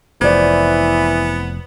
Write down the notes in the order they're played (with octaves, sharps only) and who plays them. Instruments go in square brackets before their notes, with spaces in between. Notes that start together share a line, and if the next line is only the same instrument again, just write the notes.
[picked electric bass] F1 [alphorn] E3 [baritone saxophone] B3 [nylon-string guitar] C5 D5